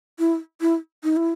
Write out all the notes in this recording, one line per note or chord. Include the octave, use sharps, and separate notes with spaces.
E4
E4
D#4
E4